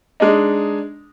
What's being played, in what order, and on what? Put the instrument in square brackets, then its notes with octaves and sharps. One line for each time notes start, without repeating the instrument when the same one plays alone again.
[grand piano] G#3 D4 D#4